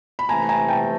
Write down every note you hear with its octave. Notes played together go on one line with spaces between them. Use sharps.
B5
C3 E3 A3 G#5 A#5
G#5 A#5
G5 A5